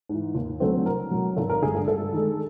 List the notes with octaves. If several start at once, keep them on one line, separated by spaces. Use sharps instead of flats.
G#2 E3
D#2
D3 F#3 A3 C4
C2 A#4
B2 F#3
G#1 A4
A#4
G2 D3 G#4
A4
G2 A4
D#3 G#3